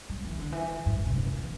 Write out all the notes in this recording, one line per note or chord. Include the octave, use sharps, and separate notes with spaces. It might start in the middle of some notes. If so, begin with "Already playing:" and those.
G3
E3
D3
E3
G2
A2
C3
D3
E3
E3